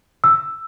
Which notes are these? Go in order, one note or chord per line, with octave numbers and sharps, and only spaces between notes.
E6